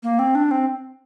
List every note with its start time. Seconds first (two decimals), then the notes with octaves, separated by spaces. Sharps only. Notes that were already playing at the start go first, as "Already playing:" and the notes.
0.03 A#3
0.19 C4
0.35 D4
0.51 C4